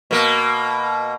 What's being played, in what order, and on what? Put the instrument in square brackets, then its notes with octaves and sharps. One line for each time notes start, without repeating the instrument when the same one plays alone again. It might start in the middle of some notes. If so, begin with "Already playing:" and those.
[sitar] B2 A#3